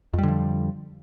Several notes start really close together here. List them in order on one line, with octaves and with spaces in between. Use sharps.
F2 G3 D3 F3